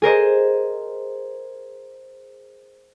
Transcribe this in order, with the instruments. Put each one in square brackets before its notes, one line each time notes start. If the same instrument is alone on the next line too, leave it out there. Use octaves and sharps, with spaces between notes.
[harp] G#4 A#4 C5 D#5